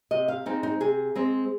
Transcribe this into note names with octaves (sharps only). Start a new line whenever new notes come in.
C3 D#5
F5
G#3 C4 D#4
D#4
C3 G#4
G#3 C4